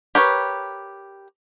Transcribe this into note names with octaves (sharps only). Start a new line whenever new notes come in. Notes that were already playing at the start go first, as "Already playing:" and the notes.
G4 A#4 B4 C#5